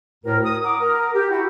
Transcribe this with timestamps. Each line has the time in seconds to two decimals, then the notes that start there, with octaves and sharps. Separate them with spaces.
0.24 D2 A2 A#4
0.45 D#6
0.63 F#5 A#5 D6 D#6
0.79 A#4
1.14 G4
1.30 E4 F#4